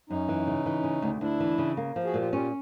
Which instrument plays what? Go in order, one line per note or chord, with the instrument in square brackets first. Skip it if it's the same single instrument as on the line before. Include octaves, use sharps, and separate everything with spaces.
[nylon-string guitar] F#2 [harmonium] C#4 D#4
[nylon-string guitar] E3
C#3
E3
C#3
D2
[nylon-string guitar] D2 [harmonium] D4 E4
[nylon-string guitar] E3
C#3
A#3
F3
[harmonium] F#4 G#4
[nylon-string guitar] A#2
[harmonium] F4 G4
[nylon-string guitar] C#4 [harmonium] F4 G4